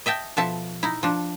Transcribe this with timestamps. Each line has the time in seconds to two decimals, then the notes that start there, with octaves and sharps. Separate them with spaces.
0.06 D#5 E5 G5 A5
0.37 B2 F3 A4 E5 A5
0.83 D#4 E4
1.03 F3 D4